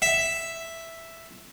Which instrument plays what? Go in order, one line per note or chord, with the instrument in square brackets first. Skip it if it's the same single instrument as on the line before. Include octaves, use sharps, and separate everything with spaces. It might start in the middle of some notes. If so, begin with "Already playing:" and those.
[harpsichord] E5